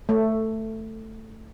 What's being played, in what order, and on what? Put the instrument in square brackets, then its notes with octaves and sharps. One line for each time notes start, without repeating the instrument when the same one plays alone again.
[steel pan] A3